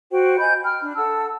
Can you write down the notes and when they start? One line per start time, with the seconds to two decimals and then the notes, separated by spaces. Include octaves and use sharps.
0.11 F#4 C5 G5
0.38 D#5 G#5 B5 G6
0.63 G5 B5 F6
0.80 D4
0.95 A4 F#5 A5 E6